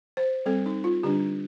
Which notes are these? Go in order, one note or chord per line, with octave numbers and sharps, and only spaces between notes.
C5
G3 C4 A4
D#4
F4
D3 G3 D4 G4